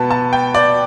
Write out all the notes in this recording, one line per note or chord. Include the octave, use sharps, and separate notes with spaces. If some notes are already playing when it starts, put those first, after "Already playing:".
Already playing: B2 B3 A5 B5
A5
G5
D5